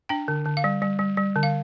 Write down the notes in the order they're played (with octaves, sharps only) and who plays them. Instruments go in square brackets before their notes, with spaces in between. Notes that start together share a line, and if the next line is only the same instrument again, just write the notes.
[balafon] D4 G5
D3
D3
F5
G3
G3
G3
G3
D3
F5